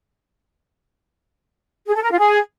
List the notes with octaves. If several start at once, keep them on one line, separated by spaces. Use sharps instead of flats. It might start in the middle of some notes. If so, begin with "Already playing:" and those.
G#4
A4
A#4
F4
G#4